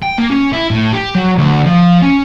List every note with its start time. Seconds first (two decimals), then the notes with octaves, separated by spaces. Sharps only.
0.02 G5
0.18 A#3
0.31 C#4
0.53 E4
0.71 A2
0.93 G4
1.15 F#3
1.38 D2
1.66 F3
2.02 C#4